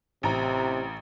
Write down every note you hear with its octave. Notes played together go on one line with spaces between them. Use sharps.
A1 C3 A#5